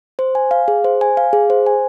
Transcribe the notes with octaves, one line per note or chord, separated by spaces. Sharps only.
C5
G#5
F5
G#4
C5
G#5
F5
G#4
C5
G#5